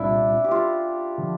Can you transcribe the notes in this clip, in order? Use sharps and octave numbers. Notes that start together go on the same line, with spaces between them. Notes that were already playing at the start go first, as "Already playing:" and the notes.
Already playing: C2 A#2 G3 C4 D4 E4 F4
G4
F4
D3 F3